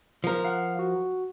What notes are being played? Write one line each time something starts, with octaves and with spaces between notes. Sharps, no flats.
F3 A#4
F5 F#5
F#4